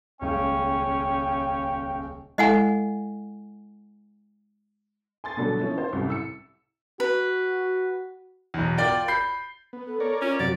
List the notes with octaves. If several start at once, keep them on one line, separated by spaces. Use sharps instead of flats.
D#1 C#2 C#4 G5
G#3 E4 A4 D#5 F#5 G#5
G#5 C6 A6
B2 D3 F#3 G3 B3 A4
F3 A#3 C#4 E4
D#3 A#4 C5
C2 F#2 A2 C3
E6 C#7
F#4 B4
B1 E2
F4 A#4 D5 G5
B5 G6 C7
B3
A4
A#4 C#5 D5
C#4 F4
F#2 C3 F#3 D5